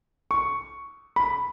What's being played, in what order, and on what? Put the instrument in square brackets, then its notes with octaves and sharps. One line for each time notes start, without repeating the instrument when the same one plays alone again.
[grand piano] C#6
B5